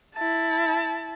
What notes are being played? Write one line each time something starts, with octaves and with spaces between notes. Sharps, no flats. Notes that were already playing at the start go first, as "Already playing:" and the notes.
E4 A5